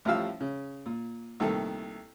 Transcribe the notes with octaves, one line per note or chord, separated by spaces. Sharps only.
A1 A2 F3 G3 F5 E6
C#3
A#2
C2 A#2 D#3 A3 A4